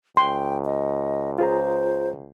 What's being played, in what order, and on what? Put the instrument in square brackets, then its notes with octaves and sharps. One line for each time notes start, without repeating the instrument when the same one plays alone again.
[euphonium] C#2 [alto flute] G5 [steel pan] C6
[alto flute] D#5
[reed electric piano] F4 G#4 A#5 [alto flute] C5